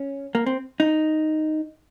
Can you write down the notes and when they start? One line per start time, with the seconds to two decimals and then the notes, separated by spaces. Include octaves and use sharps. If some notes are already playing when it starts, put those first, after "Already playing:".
Already playing: C#4
0.35 A#3
0.46 C4
0.80 D#4